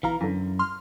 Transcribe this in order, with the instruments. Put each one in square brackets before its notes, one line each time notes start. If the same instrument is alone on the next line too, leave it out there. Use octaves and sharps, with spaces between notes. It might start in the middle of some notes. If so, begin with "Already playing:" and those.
[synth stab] B1 F5 A#5 [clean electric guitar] E3
[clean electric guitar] F#2 [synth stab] D3 E3
[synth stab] C6 F6